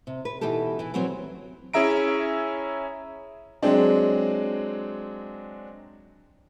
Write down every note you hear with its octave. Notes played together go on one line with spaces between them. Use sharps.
C3
B4
B2 E3 D#4 G4 A4
E3 E4
E3 F#3 G3 C4 F#4 C5
C#4 E4 G#4 E5 A#5 D7
F#3 G#3 C4 D4